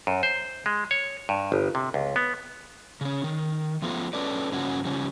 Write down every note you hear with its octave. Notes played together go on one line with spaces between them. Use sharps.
F#2
C5
G#3
C#5
G2
G1
C3
C#2
B3
C#3 C#4
D#3
F3 A3 B3 F4
C#4 A4 B4 D5
G2 C#3 F3 A#3 C#4 F#4
C#3 F3 G3